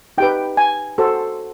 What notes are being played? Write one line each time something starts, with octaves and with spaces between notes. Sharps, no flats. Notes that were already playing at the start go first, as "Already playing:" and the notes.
D#4 G4 B4 G5
G#5
F#4 A4 C5